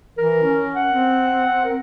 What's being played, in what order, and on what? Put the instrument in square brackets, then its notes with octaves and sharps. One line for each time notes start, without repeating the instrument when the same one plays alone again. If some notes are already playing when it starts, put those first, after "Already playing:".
[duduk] E3 [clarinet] A#4
[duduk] C#4
[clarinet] F#5
[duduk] C4
[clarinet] A#4